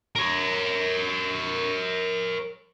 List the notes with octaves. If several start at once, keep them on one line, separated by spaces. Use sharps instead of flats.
A#4 C#5